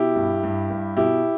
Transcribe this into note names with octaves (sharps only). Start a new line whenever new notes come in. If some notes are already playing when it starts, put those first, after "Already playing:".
Already playing: B2 E4 G4
G2
G2
G2
B2 E4 G4